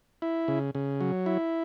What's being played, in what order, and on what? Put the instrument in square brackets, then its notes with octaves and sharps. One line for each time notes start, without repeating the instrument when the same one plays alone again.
[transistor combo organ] E4
C#3
C#3
F#3
E4